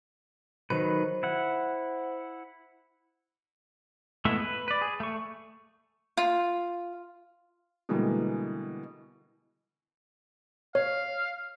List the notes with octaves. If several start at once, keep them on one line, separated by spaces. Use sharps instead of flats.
D#3 F#3 B4 C5
E4 F#5
G#3 A3 B3 E4 E5
B4
B4 D5
G#4
A3 C#6
F4
B2 D3 E3 G3 G#3 A#3
C#5 F5